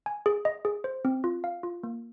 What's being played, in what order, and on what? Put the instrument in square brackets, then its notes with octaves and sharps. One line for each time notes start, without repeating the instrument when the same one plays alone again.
[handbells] G#5
G#4
D#5
G#4
C5
C4
F4
F5
F4
A#3